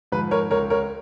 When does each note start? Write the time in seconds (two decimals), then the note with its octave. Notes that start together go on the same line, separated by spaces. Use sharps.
0.12 G#2 F3 B4
0.31 A#4 C#5
0.51 C#2 A#4 C#5
0.70 A#4 C#5